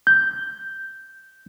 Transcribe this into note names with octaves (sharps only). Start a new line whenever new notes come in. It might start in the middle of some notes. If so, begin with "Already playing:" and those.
G6